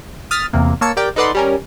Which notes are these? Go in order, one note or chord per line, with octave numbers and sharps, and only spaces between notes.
D#6 F6 A6 B6
E2 C3 A#3
A#3 C#5 A5 E6 C#7
G4 A#4 D5 G5
D#4 A4 B4 D5 F#5 C6
G3 C#4 A#4